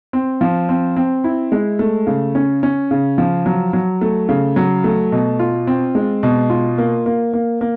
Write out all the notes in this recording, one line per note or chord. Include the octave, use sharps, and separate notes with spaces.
C4
F3
C4
C4
E4
G#3
A3
C#3
C#4
C#4
C#3
F3
F#3
F#3
A3
C#3
F#3
A3
B2
F4
C4
G#3
B2
F4
A#3
A#3
A#3
A#3